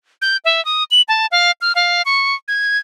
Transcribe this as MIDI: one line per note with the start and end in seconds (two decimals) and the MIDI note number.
0.22 0.37 91
0.45 0.63 76
0.65 0.84 87
0.91 1.02 102
1.08 1.26 81
1.32 1.51 77
1.61 1.73 89
1.75 2.02 77
2.05 2.35 85
2.48 2.78 92